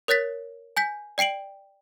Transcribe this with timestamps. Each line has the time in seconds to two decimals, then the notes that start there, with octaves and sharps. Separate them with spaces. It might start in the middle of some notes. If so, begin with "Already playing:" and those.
0.08 A#4 C#5 F#6 A6 B6
0.77 G#5 G6 B6
1.18 D5 G5 C7 D7 F#7